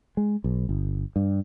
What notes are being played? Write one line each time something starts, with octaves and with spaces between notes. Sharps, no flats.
G#3
B1
G1
G2